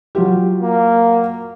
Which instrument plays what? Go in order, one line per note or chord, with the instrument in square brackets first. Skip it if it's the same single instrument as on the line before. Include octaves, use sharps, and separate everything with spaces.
[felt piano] F#3 F4 G4
[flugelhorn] A#3